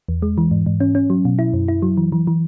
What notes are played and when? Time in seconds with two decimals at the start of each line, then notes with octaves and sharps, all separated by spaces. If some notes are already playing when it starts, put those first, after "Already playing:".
0.08 E2
0.22 G#3
0.38 E3
0.51 G#2
0.66 G#2
0.80 C#4
0.95 C#4
1.10 F#3
1.25 B2
1.39 E4
1.53 F#2
1.68 E4
1.82 F#3
1.97 E3
2.12 E3
2.27 E3